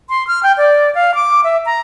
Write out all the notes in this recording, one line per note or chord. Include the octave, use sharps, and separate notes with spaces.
C6
F6
G5
D5
F5
D6
E5
A#5